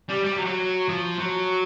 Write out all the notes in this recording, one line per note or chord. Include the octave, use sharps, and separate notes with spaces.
G3
G3
F#3
F#3
F3
F#3